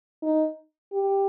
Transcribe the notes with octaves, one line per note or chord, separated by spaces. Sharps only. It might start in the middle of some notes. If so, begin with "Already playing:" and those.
D#4
G4